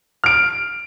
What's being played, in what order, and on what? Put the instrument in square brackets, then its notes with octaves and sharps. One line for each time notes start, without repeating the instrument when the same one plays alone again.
[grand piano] F6 D7